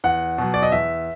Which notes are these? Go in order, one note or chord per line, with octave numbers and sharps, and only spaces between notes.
E2 F#5
B2 F#3
D5
D#5
E2 E5